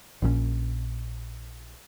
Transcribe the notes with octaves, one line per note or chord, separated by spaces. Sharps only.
A#1 A#2 D3 C#4